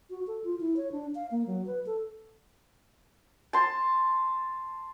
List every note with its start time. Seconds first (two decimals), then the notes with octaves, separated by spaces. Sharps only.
0.10 F#4
0.27 A4
0.44 F4
0.60 E4
0.77 C#5
0.92 D4
1.15 F5
1.31 A#3
1.47 F#3
1.67 B4
1.86 A4
3.53 A5 C6